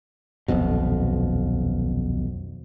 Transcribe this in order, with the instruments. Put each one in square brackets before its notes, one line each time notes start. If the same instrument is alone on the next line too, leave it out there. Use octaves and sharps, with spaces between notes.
[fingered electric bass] D#1 B1 F2 B2